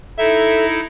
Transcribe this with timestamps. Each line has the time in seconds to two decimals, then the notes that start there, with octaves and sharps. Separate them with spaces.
0.19 D#4 E4 A4 E5